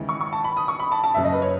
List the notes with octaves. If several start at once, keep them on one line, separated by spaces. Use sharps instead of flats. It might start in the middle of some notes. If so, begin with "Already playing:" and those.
Already playing: D#2 C#3 E3 G#3
C#6
C#6
A5
B5
D#6
C#6
B5
A5
A5
F#1 F#2 C#3 E5
D#5
B4
C#5